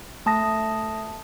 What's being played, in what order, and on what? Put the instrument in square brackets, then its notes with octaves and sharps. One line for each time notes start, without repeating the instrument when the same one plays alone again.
[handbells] A3 A5 D#6 A#6